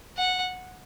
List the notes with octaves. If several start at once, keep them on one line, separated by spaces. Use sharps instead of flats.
F#5